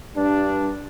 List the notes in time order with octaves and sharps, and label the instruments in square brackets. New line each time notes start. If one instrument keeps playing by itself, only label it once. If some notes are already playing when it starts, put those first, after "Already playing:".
[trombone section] G2 D4